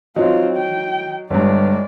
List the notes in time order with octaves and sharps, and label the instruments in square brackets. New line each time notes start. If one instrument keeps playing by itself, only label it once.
[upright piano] F#3 D#4 [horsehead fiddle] C4 F4
[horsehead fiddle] G5
[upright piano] G1 G2 [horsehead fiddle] G#3 D5